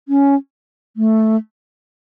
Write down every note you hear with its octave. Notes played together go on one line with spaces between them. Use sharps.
C#4
A3